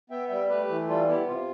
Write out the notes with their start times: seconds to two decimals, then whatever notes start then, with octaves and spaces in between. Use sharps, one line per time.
0.10 B3 E5 G5
0.29 G3 E5 G5
0.49 A3 G4 B4
0.69 E3
0.88 G3 F4 A4
1.07 B3 E4 G4
1.27 C3 F4